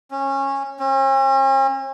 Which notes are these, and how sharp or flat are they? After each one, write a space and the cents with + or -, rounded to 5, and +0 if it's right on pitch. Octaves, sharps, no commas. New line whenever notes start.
C#4 -20
C#4 -45